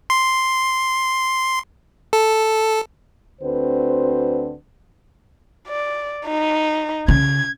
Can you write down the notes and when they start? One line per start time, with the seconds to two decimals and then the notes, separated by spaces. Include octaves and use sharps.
0.10 C6
2.13 A4
3.42 D2 D3 C4 F#4 B4 C5
5.68 D5
6.26 D#4
7.08 C#3 G#6